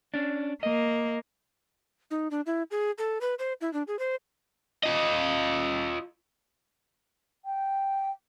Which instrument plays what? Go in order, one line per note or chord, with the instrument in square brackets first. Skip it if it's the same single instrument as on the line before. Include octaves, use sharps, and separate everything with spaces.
[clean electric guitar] C#4 D4
[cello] A#3 [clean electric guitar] D#5
[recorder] D#4
D4
E4
G#4
A4
B4
C5
E4
D4
G#4
C5
[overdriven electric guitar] F4 D#5
[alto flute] G5